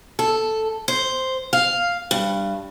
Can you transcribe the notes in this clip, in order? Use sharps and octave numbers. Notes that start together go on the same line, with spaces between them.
A4
C5
F5
G2